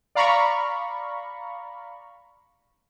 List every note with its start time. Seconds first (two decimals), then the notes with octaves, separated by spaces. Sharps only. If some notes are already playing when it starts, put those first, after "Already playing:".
0.15 D5 F5 A#5 B5 C#6